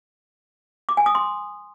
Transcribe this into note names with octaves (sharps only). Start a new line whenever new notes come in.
D6
G#5
D#6
C6